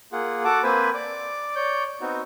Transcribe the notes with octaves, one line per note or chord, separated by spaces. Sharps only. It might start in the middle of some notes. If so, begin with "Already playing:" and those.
A#3 F4 G#4 F#5
F#4 A4 F#5 A5 D6
A#3 C4 B4 C5 G#5 B5
D5 D6
C#5 D5 G6
B3 C4 D#4 F#4